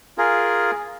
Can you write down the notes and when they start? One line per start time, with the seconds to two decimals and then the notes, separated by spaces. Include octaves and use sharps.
0.18 F4 G#4 A#4